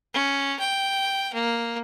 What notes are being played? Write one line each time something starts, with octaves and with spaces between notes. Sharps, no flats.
C#4
G5
A#3